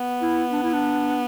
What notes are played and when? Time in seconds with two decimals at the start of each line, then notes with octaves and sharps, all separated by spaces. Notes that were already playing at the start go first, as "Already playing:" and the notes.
Already playing: B3
0.22 E4
0.52 D4
0.63 E4
0.74 D4